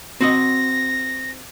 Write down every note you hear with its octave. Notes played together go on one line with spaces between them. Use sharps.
C4 F#4 D#5 A#6